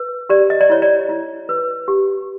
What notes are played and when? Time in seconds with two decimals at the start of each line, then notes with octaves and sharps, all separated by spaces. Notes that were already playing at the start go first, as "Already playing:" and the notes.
Already playing: B4
0.29 G4 D5
0.50 D#5
0.61 D5
0.70 E4 C#5
0.82 D5
1.09 E4
1.49 B4
1.88 G4